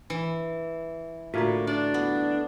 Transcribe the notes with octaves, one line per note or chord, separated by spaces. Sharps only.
E3
A2 D3 A#3 F4 F#4 A#5
D4 D5
B3